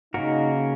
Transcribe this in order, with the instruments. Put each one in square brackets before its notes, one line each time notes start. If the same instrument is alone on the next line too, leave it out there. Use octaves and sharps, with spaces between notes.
[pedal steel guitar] C#3 A#3 C#4 F#4 A#4 [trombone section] D#4